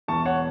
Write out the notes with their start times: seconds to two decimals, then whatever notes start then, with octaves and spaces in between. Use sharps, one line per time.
0.08 E1 E2 E3 A5 C#6
0.25 C#5 F#5